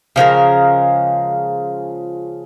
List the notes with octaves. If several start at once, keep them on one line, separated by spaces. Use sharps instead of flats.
C#3 F3 G#3 A#4